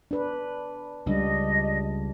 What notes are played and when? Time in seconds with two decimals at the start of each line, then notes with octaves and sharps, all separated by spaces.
0.11 D4 B4
1.06 C#2 G3 D4 D#5